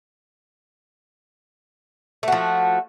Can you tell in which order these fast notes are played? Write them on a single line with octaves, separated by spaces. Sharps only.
A3 F#4 F3